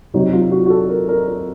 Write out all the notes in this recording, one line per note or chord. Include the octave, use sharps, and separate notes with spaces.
C3 F#3 D#4
F4
F#4
F#4
A4
A#4
A#4
A#4